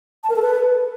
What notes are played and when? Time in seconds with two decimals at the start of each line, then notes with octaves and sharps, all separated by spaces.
0.23 A5
0.30 A#4
0.36 A4
0.42 B4